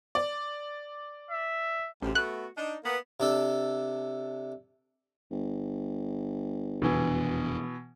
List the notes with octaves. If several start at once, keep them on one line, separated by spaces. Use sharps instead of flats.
D5
E5
A1 D2 C3
A3 B3 F#4 F#6
D4 D#4
A#3 B3
C3 D4 A4
G1
F1 E2 B2 E3 D4